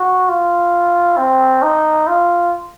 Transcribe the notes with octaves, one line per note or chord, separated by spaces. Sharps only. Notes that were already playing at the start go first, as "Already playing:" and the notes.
Already playing: F#4
F4
C4
D#4
F4